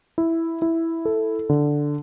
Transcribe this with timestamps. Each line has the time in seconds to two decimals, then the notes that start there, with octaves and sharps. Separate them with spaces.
0.18 E4
0.62 E4
1.05 A4
1.49 D3